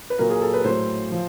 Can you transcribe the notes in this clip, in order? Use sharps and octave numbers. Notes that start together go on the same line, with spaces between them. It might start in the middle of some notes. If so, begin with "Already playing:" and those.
B4
A#2 F#3 A#4
G#4
A4
B4
A2 F#3 C5
F3